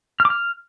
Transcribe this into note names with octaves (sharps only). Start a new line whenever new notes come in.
F6
D6
F6